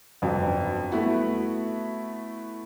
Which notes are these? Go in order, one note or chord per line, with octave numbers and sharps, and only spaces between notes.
G1 F2 F#3
A3 B3 E4 F#4